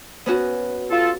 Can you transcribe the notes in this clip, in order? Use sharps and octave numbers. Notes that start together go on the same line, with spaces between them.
B3 C#4 F#4
F4 A4